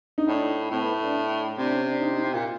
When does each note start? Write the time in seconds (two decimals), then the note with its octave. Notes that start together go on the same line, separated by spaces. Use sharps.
0.18 D#4
0.28 A2 D4
0.71 A2 C4
0.83 B3
1.03 D4
1.14 D4
1.58 C3 D4
1.71 C#4
1.86 D4
2.01 D#4
2.12 D#4
2.23 E4
2.34 A#2 F4